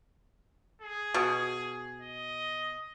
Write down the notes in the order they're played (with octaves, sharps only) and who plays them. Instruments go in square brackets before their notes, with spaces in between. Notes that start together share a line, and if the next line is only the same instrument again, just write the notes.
[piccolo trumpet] G#4
[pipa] B2
[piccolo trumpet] D#5